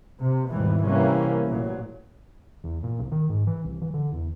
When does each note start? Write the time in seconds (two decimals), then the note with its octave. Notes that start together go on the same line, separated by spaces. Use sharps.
0.21 C3
0.50 G#1 D#2 B2 E3 G3
0.84 C3 E3 G3 A#3 C#4
1.47 A1 A#2 F#3
2.64 E2
2.83 A#2
2.99 C2
3.11 D#3
3.29 G#2
3.47 E3
3.64 C2
3.81 E3
3.93 D3
4.13 E2